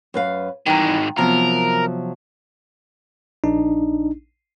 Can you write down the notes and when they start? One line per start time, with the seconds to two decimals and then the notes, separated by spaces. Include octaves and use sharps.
0.14 F#2 B4 F5
0.66 G#2 D#3 E3 G3 G5 A#5
1.18 C3 F3 F#3 B3 A#4
3.44 A#1 D4 D#4